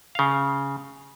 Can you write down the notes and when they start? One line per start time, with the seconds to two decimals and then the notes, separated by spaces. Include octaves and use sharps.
0.15 C#3 F5